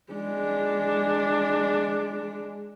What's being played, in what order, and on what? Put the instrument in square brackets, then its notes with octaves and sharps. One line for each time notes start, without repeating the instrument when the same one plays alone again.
[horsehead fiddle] G#3 D4